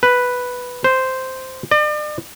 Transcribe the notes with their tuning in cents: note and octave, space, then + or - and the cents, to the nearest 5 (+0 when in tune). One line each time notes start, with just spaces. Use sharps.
B4 +0
C5 -5
D5 +40